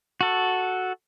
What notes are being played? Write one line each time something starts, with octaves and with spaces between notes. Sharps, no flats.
F#4 A4